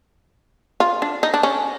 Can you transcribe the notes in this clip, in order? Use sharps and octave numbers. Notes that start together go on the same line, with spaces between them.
F4
D4
D#4
D4
C#4